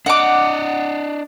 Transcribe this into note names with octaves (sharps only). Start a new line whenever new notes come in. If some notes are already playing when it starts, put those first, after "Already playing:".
D4 D#5 F#5 D6